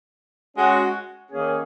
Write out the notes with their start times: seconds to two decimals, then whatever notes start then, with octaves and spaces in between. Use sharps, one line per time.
0.56 G#3 C#4 F#4
1.31 D#3 A#3 C#4 G#4